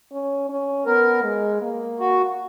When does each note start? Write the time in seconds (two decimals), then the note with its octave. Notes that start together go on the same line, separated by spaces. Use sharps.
0.12 C#4
0.49 C#4
0.86 B3 A#4
1.24 G#3
1.62 A#3
2.00 F#4